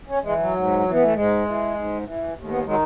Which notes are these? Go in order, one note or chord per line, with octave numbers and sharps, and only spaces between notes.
C#4
E3 G#3
F#3
G#2
E3
B3
A3
G#2 G#3
E3
G#2
E3
D#2
A3
B3
D#3 F#3 G#3